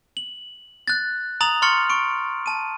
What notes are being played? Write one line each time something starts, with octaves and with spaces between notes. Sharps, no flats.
F#7
F#6 A6
A#5 D#6 A6 F7 F#7
C6 C#6 F6 A6 C#7
C#6 D7
A5 D#7